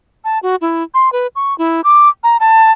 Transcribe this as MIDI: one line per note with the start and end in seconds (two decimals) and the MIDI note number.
0.24 0.39 81
0.43 0.56 66
0.61 0.83 64
0.94 1.12 84
1.13 1.27 71
1.36 1.57 85
1.58 1.81 64
1.84 2.09 86
2.24 2.37 82
2.40 2.72 81